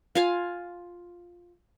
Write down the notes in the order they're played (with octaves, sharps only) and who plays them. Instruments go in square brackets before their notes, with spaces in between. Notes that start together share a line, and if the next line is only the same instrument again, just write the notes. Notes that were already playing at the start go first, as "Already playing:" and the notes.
[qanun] F4 F5 G#5